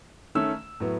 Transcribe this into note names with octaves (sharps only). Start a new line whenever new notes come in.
D#3 A3 C#4 E6
A2 F#3 B3